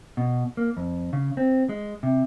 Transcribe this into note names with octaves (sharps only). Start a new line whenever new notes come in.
B2
A#3
F2
C#3
C4
G#3
C3